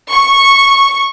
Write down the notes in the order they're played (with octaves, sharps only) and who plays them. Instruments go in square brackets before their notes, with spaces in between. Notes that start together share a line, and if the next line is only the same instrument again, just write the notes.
[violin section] C#6